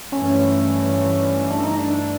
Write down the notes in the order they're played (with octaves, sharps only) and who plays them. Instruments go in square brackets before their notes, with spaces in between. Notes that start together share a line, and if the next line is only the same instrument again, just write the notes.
[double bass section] G2 E3 A3 [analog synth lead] C#4
[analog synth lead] D4
D#4
D4